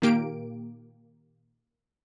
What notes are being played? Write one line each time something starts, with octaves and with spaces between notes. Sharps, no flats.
A#2 D#3 A#3 G4 D7